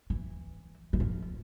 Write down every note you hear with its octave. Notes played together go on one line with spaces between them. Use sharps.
E3
E3
F3